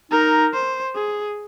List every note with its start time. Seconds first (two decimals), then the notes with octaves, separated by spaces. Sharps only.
0.11 D#4 A#4
0.54 C5
0.95 G#4